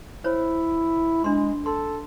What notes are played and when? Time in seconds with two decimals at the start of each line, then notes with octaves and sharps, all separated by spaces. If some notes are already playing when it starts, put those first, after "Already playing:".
0.24 E4 C5 C#5
1.24 G#3 D4 C6
1.66 A4 C6